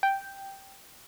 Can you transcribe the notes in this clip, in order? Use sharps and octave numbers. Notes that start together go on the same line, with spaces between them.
G5